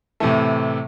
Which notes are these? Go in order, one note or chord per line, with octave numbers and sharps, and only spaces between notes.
A2 C3 E3 A3